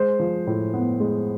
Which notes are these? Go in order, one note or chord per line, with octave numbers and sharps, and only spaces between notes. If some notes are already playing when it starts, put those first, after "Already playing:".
Already playing: G#3 C5
F3
A2
B3
G#3